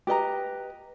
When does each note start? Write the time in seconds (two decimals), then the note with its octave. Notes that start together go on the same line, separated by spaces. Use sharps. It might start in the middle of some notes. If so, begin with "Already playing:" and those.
0.07 G4 B4 D#5 A#5